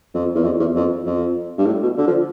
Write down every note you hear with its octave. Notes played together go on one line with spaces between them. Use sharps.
F2
E2
F2
E2
F2
F2
G2
A2
B2
D3
F3